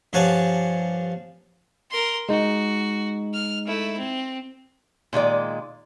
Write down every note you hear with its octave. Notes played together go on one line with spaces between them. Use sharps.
G2 F3 C#5 F#5 G#5 A5
A#4 C6
G#3 D#4 F#4
F6
A3 E4
C4
A#2 D#3 G#3 D5